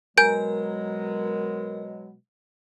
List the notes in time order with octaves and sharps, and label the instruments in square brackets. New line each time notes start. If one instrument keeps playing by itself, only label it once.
[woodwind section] B2 F#3 G#3 [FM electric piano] A#4 [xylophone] G#5 G6 D7